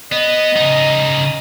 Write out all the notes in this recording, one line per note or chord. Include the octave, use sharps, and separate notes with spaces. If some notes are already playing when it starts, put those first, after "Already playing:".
B3 D#5
C#3 D#4